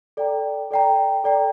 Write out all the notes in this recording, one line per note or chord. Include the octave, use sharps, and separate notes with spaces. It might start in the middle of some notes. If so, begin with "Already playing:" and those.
A4 D5 G5 A#5
A4 D5 G5 A#5
A4 D5 G5 A#5